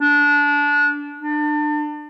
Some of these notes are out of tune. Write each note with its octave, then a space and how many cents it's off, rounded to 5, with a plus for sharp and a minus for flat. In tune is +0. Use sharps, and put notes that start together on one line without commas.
D4 -20
D4 +30